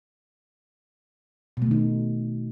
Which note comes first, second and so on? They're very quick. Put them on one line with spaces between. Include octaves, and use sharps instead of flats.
B2 A3 D#3 D#4